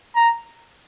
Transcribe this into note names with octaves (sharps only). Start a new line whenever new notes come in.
A#5